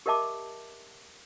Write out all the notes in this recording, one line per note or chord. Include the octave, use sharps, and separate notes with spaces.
G4 A#4 D#5 E5 A5 D6